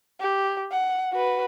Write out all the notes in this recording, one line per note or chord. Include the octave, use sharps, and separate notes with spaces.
G4
F#5
F#4 B4